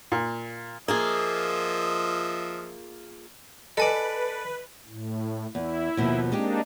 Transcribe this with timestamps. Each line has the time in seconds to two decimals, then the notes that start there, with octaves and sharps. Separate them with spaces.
0.12 A#2
0.88 F3 A#3 F4 G#4 D#5 E5
3.77 A4 B4 D5 D#5 G#5
4.86 A2
5.55 E2 E4
5.97 D#2 B2 F3
6.32 G#3 A#3 C4 D4 D#4 G4